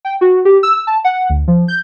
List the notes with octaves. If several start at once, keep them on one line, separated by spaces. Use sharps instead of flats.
G5
F#4
G4
E6
A5
F#5
D2
F3
G6